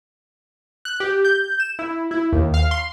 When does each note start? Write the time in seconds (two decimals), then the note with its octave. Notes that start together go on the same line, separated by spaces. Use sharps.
0.85 F#6
1.00 G4
1.25 G6
1.60 E7
1.79 E4
2.11 E4
2.33 D#2
2.54 F5
2.71 C6